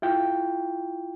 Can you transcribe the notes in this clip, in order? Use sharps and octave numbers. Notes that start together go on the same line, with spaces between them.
E4 F4 G5